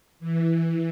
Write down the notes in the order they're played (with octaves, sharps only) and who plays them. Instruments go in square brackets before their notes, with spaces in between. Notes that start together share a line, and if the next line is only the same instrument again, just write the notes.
[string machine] E3